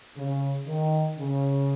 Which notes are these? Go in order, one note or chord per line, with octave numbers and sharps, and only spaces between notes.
C#3
D#3
C#3